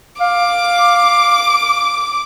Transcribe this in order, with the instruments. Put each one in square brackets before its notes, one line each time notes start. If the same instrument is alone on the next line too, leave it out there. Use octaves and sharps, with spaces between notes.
[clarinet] F5 [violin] D6